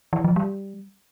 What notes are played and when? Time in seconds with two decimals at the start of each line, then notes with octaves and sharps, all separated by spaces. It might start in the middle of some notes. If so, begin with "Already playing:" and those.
0.13 E3
0.24 F3
0.36 G3